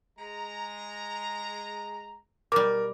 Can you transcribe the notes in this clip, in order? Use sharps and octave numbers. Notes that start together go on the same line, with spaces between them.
G#3 A#5
B2 G3 A#4 D6